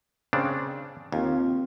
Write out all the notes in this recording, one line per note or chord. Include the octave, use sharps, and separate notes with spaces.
C#3 C4 D4
D#2 C4 F4 F5